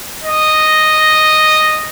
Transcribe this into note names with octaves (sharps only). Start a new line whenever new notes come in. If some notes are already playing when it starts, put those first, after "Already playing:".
D#5